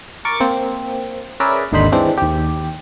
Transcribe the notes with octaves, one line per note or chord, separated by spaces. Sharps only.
A#4 C#6 D6 A6
A#3 C4
C#4 G#4 A#4 B4 D5 E5
G#1 D#2 D3 D#4 C5 B5
E3 G#3 C4 D4
D#2 G4